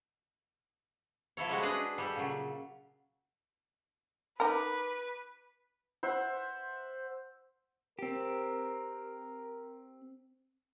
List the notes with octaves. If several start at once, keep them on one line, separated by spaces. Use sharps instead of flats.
F3 E4 A4 C#5
G3 G#3 F#4
D4 G#4 B4 D#5
G3 G4 A4
A#2 C#3 F#3
D#4 A#4 B4 B5 D6
C5 E5 F#5
C4 G4 A#4